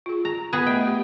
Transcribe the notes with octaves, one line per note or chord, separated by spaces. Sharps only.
F4 G#4
A#5
B3 G#4
A3 D#5 G5
G4